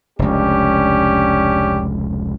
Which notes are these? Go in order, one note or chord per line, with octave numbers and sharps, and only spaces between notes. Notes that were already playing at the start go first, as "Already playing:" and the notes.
F1 C#2 C#4 D4 G4